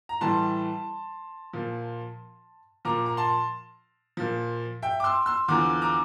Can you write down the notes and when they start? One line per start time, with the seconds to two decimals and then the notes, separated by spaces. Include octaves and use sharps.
0.09 A#5
0.21 A2 E3 G3 A5 C6
1.53 A#2 F3
2.85 A#2 F3 A#5 D6
3.06 A#5
3.17 A5 C6
4.17 A#2 F3
4.82 E5 G5
5.00 D6
5.04 C6 E6
5.26 C6 E6
5.48 E2 D3 F3 A#5 D6
5.82 A#5 D6